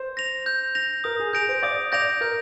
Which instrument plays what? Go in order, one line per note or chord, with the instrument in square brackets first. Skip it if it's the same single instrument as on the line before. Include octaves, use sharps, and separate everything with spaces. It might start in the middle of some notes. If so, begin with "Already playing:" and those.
Already playing: [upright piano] C5
[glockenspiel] A#6 F7
G6
A#6 F7
[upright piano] A#4 [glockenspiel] D#6
[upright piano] G#4
[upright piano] G#4 [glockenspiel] G6 A#6 D7 F7
[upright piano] C5
[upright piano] D5 [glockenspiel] D#6
[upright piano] D5 [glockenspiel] G6 A#6 D7 F7
[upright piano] A#4 [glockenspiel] G6